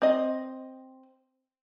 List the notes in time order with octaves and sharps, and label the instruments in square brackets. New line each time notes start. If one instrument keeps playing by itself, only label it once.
[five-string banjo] C4 D#5